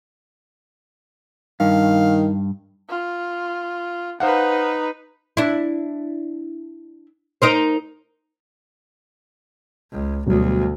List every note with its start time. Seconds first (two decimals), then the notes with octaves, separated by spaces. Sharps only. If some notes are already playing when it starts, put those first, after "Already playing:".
1.60 G2 D#3 F5
2.89 F4
4.20 D#4 B4 C5 F5 F#5
5.37 D4 E4
7.42 D#4 A#4 C5
9.92 C#2
10.26 D2 B2 F#3 G3